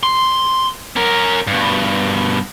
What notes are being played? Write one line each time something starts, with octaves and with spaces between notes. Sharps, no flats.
C6
C#4 A#4
G2 B2